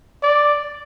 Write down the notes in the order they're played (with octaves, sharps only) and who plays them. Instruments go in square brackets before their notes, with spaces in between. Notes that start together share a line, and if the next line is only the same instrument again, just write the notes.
[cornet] D5